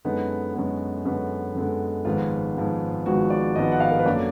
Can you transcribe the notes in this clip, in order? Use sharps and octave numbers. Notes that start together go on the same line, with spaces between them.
F#2 D3 G#3 B3 D#4
F#2 D3 G#3 B3
F#2 D3 G#3 B3
F#2 D3 G#3 B3
G#1 G#2 F3 G#3 B3 F4
G#1 G#2 F3 G#3 B3
G#1 G#2 F3 G#3 B3 F#4
D5
G#1 G#2 F3 G#3 B3 D#5
F#5
F5
A#4
B4
F#2 D3 F#3 A#3 D5